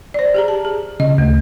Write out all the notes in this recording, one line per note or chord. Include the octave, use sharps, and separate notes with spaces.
C5 D5
G4 G#4 A#5
A5
G#4
C#3 D#5
D2 A3